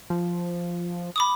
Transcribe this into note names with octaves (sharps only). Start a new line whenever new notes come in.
F3
B5 D6 D#6